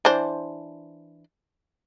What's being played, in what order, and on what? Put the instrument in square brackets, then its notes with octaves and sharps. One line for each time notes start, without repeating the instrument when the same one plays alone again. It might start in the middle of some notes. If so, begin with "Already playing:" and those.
[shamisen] E3 D4 C5